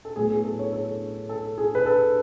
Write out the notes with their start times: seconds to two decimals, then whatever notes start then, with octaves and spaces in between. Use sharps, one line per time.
0.05 A4
0.16 A2 F#3 B3 G#4
0.31 G#4
0.45 A4
0.59 C#5
0.73 A4
1.29 A4
1.58 G#4
1.75 B4
1.86 A4